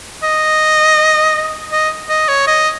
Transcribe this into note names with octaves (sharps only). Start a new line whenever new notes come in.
D#5
D#5
D#5
C#5
D#5